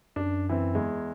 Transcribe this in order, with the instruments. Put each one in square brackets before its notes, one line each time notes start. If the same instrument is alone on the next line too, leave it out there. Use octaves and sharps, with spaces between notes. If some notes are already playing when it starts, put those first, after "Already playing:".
[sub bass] F#2 [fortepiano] D4
[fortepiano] E3 C4
E2 G#3